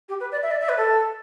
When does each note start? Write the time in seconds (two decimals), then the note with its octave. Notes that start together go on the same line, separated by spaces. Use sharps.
0.09 G4
0.20 B4
0.32 D5
0.43 E5
0.51 D5
0.61 E5
0.69 B4
0.78 A4